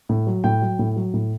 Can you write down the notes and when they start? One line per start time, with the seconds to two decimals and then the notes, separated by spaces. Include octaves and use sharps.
0.09 A2
0.27 F#3
0.44 A2 G5
0.62 F#3
0.79 A2
0.96 F#3
1.14 A2